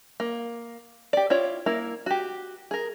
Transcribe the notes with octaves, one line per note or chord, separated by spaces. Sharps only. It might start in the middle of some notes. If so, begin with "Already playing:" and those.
A#3
G4 D5
E4 F4 C#5 D5
A#3 E4 A#4
F#4 G4
G#4 A#4